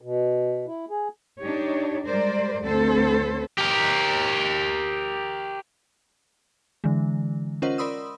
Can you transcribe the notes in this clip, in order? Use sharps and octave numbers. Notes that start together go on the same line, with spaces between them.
B2
E4
G#4
D4 D#4 G4 C#5
G3 G#3 A#4 C5 D5
D2 C4 A4 C5
G4 A#4
D3 E3 G#3
C#4 F4 A#4 C5 D#5 F#5
A#4 D5 B5 C6 D#6 E6